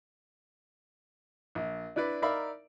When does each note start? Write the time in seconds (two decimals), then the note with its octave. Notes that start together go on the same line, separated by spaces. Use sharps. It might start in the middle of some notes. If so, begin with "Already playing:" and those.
1.55 A#1
1.96 D4 E4 B4 D5
2.22 D#4 A#4 D5 E5 F5 B5